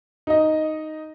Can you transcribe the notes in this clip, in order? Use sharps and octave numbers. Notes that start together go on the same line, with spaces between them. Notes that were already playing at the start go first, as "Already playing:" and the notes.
D#4 D#5